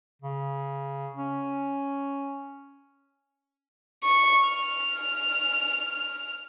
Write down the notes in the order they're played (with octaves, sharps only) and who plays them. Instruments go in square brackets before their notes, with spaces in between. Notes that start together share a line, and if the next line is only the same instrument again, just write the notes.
[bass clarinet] C#3
C#4
[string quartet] C#6
F6